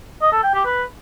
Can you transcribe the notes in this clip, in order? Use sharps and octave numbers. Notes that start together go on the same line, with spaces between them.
D#5
A4
G5
G4
B4